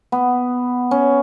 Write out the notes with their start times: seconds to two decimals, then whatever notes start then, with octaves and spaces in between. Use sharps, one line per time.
0.12 B3
0.91 C#4